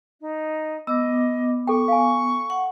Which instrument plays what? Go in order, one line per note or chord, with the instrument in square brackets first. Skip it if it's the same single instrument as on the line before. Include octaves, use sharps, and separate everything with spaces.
[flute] D#4
[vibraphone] B3 D6 [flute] D#5 [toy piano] E6
[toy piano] A4 G5 [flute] C#6
[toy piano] F5 G#5
[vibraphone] F#5